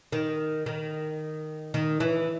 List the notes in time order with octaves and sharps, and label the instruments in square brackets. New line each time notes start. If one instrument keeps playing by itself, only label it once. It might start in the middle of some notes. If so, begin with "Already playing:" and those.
[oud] D#3
D#3
D#3
E3